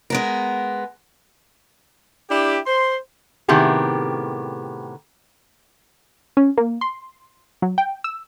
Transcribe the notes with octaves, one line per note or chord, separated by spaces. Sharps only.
G#3 B3 A#4
D4 E4 G4
C5 C6
A2 C3 D#3 B3 G4 G#4
C#4
A#3
C6
F#3
G5
E6